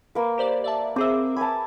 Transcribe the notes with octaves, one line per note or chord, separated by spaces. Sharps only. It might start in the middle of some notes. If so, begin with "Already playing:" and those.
A#3 B4
G4 C5 D5
D5 E5 A5
C4 G#4 C5 E5 D6
G#5 A5 B5